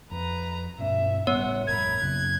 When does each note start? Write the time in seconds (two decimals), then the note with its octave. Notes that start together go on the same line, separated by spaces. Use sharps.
0.12 F2 B4 A#5
0.79 G2 B2 C#4 E5
1.27 G#1 A2 G3 B3 C#5 F#5
1.67 F1 A#1 A#4 B5 G#6
2.01 F#2 C#3 F#6